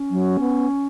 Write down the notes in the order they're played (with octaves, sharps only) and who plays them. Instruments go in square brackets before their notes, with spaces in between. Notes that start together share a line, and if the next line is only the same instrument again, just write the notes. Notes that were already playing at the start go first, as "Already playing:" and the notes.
Already playing: [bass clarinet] C#4
[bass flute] F#3
B3